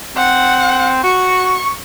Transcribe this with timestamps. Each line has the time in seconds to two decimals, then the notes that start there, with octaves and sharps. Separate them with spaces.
0.17 C4 F#5
1.04 F#4 C#6